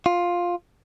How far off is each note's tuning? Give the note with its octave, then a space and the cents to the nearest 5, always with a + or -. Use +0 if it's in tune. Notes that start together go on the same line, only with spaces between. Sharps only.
F4 +10